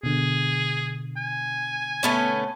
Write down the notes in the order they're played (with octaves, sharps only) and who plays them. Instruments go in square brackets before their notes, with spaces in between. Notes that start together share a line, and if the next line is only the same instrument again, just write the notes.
[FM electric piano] B2 D3 [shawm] G#4
[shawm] G#5
[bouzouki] A3 B3 C#4